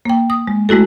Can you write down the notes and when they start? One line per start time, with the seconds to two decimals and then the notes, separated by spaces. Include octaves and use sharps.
0.05 A#3 G5
0.30 D#6
0.47 G#3
0.69 G#3 A3 E4 F#4 A4